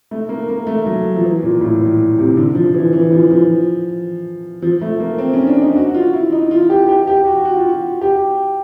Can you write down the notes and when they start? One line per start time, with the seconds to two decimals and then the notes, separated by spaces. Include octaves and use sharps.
0.11 A3
0.29 A#3
0.49 A#3
0.67 A3
0.86 F#3
1.16 F3
1.23 E3
1.43 A#2
1.61 A2
1.81 A#2
2.18 C3
2.37 D3
2.55 F3
2.74 E3
2.93 E3
3.12 F3
3.31 F3
4.62 F3
4.81 A3
5.00 A#3
5.18 C4
5.34 C#4
5.47 D4
5.62 D#4
5.75 F#4
5.89 F#4
5.94 F4
6.13 E4
6.32 D#4
6.51 F4
6.70 G4
6.89 G4
7.07 G4
7.26 F#4
7.45 F#4
7.56 F4
7.69 F#4
8.01 G4